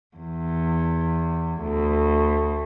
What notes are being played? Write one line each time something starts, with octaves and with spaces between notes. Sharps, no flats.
E2
D2